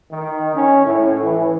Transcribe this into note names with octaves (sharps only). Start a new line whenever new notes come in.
D#3
C#4
A2
E3